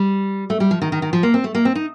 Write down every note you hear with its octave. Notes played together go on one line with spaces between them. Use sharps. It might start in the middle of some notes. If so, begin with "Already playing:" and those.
Already playing: G3
A3
G3
F3
D#3
D#3
D#3
F3
A#3
C4
A3
A#3
C4
D#4